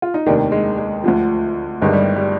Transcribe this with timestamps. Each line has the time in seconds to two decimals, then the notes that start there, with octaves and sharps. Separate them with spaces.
0.02 F4
0.14 D#4
0.26 F1 D#2 D#3 D4
0.52 G#3
0.78 G#3
1.04 D2 D3 F3
1.81 G1 G2 D#3 G#3
1.93 G3
2.16 G3